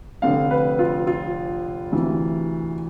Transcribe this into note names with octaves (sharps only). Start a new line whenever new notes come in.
F1 F2 D3 F5
B4
F4
F4
D2 C3 E3